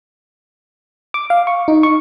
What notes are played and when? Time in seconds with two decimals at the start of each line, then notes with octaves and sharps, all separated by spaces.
1.14 D6
1.30 F5
1.47 C#6
1.68 D#4
1.83 C#6